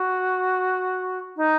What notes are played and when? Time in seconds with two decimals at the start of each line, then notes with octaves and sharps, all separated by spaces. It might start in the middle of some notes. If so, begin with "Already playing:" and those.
Already playing: F#4
1.36 D#4